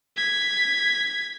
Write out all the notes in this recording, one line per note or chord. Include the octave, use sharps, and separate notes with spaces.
G#6 B6